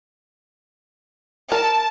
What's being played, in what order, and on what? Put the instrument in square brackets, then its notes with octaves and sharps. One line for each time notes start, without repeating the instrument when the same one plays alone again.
[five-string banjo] A#4 [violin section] A5